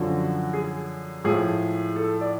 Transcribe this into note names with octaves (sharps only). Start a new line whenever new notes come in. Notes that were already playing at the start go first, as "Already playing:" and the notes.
Already playing: F#2 D3 F3 F#4
G#4
A2 F3 G#3 G#4
A4
D5